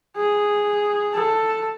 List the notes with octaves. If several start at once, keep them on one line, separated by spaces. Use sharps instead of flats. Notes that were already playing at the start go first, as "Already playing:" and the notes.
G#4
A4